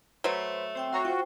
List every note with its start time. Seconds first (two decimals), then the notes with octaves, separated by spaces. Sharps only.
0.24 F#3 A3 B4 C5
0.75 C4 C5 G5 E6
0.92 F#4 C#5 A#5 C6
1.05 F4 C5 G5